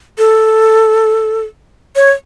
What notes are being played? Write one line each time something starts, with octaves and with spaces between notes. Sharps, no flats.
A4
C#5